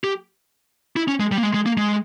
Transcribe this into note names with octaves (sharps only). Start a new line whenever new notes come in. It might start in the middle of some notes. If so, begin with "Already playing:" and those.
G4
E4
C#4
G#3
G3
A#3
G#3
G#3
A#3
G#3